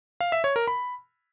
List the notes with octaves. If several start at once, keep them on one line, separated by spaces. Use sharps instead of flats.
F5
E5
C#5
A#4
B5